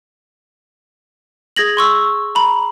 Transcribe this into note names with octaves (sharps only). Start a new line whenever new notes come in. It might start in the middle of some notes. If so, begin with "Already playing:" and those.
G#4 G#6 A#6 F#7
C6 C#6 E6
A#5 B5